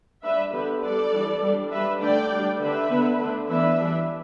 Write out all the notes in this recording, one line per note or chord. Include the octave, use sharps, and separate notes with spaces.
G3 D4 B4 E5
D3 B3 D4 G4 B4
G3 B3 D4 A4 D5
E3 G3 D4
G3 D4
G3 D4 B4 E5
D3 A3 D4 D5 G5
G3 D4
D3 A3 D4 B4 E5
D3 B3 D4
D3 A3 D4
E3 B3 D4 B4 E5
E3 G3 D4